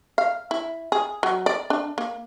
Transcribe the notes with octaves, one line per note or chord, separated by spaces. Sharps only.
F5
E4
G#4
F#3
D5
D4
A#3